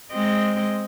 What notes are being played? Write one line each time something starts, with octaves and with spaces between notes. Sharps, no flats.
G#3 C4 D#5